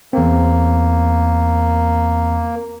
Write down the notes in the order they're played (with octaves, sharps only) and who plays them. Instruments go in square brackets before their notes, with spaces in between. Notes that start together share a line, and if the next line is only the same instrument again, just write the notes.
[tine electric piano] E2 C4 [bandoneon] A#3